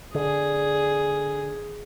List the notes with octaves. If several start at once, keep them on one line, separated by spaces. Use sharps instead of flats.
D3 G#4